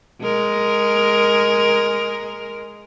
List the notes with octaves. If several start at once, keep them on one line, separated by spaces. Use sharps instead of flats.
G#3 A#4